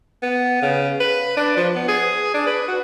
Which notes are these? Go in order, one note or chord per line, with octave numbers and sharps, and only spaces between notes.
B3
C#3
B4
D4
F3
B3
G#4
D4
B4
F#4